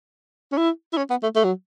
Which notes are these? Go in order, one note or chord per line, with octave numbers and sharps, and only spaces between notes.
C#4
E4
E4
C#4
B3
A3
A3
F#3